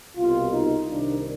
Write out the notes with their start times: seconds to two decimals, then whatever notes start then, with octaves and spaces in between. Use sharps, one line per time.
0.17 C2 B2 F4
0.52 D#4
0.88 C2 C3 D#3 D4